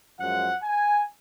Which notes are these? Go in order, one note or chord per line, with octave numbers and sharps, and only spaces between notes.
F#2 F3 G#3 F#5
G#5